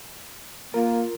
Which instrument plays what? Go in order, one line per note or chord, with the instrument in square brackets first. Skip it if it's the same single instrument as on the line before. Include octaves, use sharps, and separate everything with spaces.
[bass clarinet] A#3 [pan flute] F4 [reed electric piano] A#4